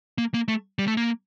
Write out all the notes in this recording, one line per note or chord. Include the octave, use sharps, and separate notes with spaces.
A#3
A#3
A3
G3
A3
A#3